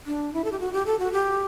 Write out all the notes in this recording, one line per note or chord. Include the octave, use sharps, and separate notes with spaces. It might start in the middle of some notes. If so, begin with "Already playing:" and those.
D4
E4
A4
G4
F#4
G4
A4
F#4
G4